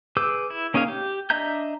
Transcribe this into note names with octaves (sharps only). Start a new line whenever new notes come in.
G#4 B4 D6 E6 G6
E4
A#3 C#4 D#4 G#4 F5
G4
D4 D#5 E5 A#5 G6